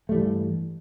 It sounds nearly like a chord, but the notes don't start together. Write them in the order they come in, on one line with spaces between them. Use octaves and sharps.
A3 G3 E3 G2